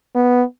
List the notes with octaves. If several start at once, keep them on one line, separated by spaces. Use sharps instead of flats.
B3